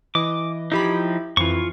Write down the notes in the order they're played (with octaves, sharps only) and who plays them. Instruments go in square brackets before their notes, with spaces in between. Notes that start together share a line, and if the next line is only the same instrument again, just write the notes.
[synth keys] E3 D#5 [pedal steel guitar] D6
[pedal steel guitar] F3 D#4 [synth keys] E4 G4 B5
[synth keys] F2 E3 [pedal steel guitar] F4 C#6